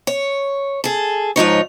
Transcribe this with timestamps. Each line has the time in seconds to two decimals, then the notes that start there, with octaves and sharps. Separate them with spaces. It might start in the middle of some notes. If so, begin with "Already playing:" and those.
0.07 C#5
0.84 G#4 A4
1.36 G#2 F3 D#4 C#5